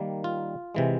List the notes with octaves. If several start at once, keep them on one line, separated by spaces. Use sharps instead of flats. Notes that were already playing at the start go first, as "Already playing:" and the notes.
Already playing: D#3 G3 A#3
F4
C3 E3 G#3